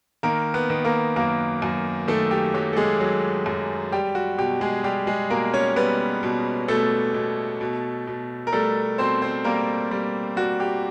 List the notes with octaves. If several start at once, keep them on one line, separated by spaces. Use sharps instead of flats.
D#3 A#3 A#4
B3 B4
D#3
A#3 A#4
F#2 A#3 A#4
F#2
D#3 A3 A4
G4
F#3 G4
A4
G#3 G#4
F#3
F#2
G3 G4
F#4
B2 G4
G#3 G#4
G3 G4
G#3 G#4
B2 A#3 A#4
C#4 C#5
G3 B3 B4
B2
B2 A3 A4
B2
B2
B2
A#4
G3 A3 A4
B2 C4 C5
C4 C5
G3 A#3 A#4
G3
G3 F#4
G4